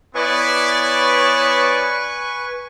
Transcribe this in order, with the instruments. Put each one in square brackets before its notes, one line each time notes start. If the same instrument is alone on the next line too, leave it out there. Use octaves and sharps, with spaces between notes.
[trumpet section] B3 E4 D5 [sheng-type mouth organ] B4 G#5 C#6 [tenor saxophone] C#5